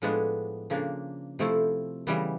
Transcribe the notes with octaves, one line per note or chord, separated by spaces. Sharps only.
A2 F3 G#3 B3 D4
C#3 F3 A#3 D4
C3 F3 A3 C4 E4
C#3 E3 G3 B3